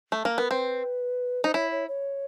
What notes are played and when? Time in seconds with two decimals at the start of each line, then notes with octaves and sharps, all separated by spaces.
0.12 A3
0.25 A#3
0.38 B3 A#4
0.50 C4 B4
1.44 D#4 C5
1.54 E4 C#5
1.71 C#5
1.88 C#5